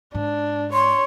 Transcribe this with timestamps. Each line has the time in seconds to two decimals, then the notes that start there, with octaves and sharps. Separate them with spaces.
0.15 G#2 D4
0.73 C#5 C6